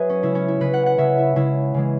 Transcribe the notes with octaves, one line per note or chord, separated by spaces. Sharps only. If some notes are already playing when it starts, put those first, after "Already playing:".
Already playing: F#3 F#4 G#4 B4 C#5 E5
C#4
C#3 G#3 E4
C#4
E4
C#3 G#3 B4
F#5
F#5
C#3 G#3 E5
E4
C#3 G#3 E4
C#3 E3 G#3